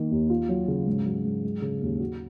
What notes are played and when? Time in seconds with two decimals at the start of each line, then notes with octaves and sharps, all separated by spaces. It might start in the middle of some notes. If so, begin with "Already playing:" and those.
Already playing: D#3 A#3
0.11 D#2
0.30 F4
0.49 F#3
0.68 C#3
0.86 G#2
1.06 F#3
1.25 G#2
1.44 G#3
1.62 C#3
1.82 D#2
2.00 F#4